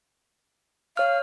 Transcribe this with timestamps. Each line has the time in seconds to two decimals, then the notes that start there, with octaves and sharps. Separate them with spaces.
0.97 C#5 F5 F6